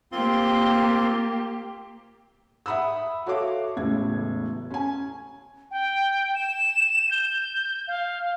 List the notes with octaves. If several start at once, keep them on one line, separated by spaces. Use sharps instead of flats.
A#3 C4 F4 G4 C6
E5 F#5 B5 D#6 E6
F#4 A4 C#5 E5 F5 D6
E1 A1 A2 C#3 G#6
C#4 G#5
G5
E7
G6
F5